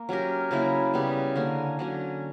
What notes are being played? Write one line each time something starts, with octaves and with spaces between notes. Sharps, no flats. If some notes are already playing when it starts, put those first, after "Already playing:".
Already playing: A#3
F#3 C#4 G4 A#4
C#3 F#3 A#3 E4
C#3 G3 B3
D3 A#3 C#4
D3 F#3 C#4